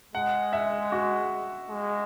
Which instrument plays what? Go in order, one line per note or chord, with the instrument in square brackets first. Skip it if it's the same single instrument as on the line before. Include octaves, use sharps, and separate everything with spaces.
[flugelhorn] G#3 [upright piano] F#5
[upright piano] E5
F#4
[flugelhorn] G#3